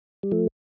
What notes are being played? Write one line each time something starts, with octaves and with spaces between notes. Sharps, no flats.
G3
F3 A3